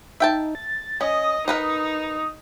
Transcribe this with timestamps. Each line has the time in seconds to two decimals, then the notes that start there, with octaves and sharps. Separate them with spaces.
0.20 D#4 E5 G5 A5
0.55 A6
1.01 C#4 D#5 D#6
1.48 D#4 A#4 B4 D#5